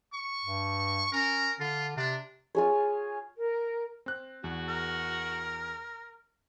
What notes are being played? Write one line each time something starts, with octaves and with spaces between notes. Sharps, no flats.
C#6
G2
C#4 A#4
D3 F4
C3 D4
F4 G#4 C#5
A#4
C4 F#6
E2 F#4
A#4